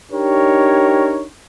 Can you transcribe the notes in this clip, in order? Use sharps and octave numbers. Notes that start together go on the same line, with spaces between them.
D4 D#4 G4 A#4 C#5